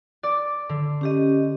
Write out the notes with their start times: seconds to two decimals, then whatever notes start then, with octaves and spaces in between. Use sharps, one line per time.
0.23 D5
0.69 D3
1.01 C#4 G4 D#5